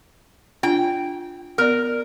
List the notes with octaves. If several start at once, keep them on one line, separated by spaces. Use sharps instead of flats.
D4 F4 G5
B3 A#4 D5